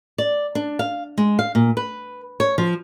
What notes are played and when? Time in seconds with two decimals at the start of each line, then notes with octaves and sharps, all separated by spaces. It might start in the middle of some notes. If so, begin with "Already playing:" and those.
0.18 D5
0.55 D4
0.79 F5
1.18 G#3
1.39 F5
1.55 A#2
1.77 B4
2.40 C#5
2.58 F3